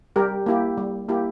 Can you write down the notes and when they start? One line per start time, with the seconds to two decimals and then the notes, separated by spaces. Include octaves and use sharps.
0.16 G3 G4 A#4
0.46 A#3 E4 G4
0.77 G3
1.09 A#3 E4 G4